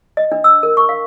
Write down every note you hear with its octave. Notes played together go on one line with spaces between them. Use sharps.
D#5
D4
E6
A#4
C#6
F5